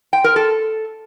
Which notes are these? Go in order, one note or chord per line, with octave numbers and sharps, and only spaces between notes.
G5
A#4
A4